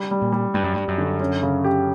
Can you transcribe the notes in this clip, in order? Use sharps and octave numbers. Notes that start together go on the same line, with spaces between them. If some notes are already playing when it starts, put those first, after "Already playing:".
Already playing: G3
G3
A#2
G3
G2 G3
F#2
G2 G3
F#2
D3
C#4
C#3
G4